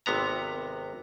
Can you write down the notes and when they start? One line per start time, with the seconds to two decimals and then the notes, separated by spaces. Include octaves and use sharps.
0.06 G#1 C3 B3 A#5